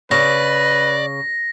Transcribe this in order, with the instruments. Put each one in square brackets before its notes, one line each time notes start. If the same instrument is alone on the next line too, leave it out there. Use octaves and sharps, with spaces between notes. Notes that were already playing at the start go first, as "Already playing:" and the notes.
[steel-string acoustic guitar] C#3 [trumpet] B4 [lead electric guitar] D5 [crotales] A#6